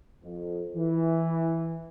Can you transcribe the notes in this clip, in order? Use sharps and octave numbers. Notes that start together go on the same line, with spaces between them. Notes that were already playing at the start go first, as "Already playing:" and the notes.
F2
E3